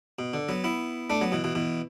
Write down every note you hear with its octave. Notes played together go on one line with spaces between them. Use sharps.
B2
D3
F#3 B3
B3 E4
A3 D4
F#3 B3
B2 E3
B2 E3
B2 E3